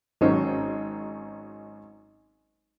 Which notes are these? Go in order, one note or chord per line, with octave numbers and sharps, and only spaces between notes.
G#1 D#3 F#3 C#4 D#4 C5